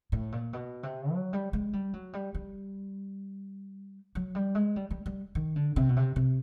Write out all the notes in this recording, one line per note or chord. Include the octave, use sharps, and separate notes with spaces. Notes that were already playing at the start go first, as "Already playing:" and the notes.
A2
A#2
B2
C3
F#3
G3
G#3
G3
F#3
G3
G3
F#3
G3
G#3
G3
G3
G3
D#3
D3
C3
B2
C3
C3